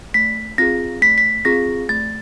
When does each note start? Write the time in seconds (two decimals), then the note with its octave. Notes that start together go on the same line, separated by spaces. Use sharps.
0.14 A3 B6
0.58 C4 F4 G#4 A#6
1.02 A3 B6
1.18 B6
1.45 C4 F4 G#4 A#6
1.89 A3 A6